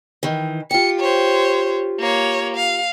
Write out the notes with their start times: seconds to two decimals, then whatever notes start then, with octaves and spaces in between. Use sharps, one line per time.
0.23 D#3 E3
0.71 F4 G4 C#7
1.00 C5 C#5
1.99 A#3 C#5
2.56 F5